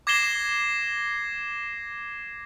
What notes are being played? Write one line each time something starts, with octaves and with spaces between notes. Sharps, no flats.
D6 G#6 A#6 C7 E7 G7